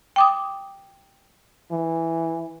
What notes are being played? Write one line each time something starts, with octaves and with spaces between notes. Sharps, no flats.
G5 D6 D#6
E3